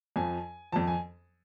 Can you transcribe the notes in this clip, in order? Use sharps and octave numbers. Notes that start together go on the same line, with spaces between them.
F2 F3 G#5
F2 F3 A5
G#5